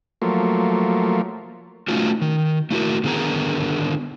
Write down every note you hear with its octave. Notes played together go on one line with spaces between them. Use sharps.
F3 F#3 A3 A#3
A3 C#4 D#4 F4 F#4
D#3
A3 E4 F#4 A#4
D3 D#3 B3 G#4 A#4 A#5